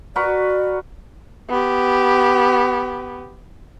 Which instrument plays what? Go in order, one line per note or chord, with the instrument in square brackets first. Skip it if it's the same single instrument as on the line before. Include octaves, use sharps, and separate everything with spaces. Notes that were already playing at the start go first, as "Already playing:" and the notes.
[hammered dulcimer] F#4 A#4 B4 [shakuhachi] D5
[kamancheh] B3 G4